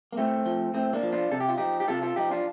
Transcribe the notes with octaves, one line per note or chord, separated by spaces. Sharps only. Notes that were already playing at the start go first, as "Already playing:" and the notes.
A#3
A2 A3 C4
F3
A2 A3 C4
A#3 D4
F3
D4 F4
C3 A4
G4
F4
F3 D#4 G4
G4
C3 F4 A4
F4 A4
F3 D#4 G4
D4 F4